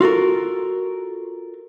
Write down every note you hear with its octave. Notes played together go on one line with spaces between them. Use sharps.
F4 F#4 A4 A#4